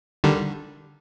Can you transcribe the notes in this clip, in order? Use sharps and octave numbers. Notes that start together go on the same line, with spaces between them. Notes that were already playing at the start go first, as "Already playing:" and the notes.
D3 D#3 G3